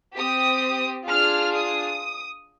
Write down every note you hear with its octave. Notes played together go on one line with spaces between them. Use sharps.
C4 G4 D#6
D4 F4 G#4 F6
D#6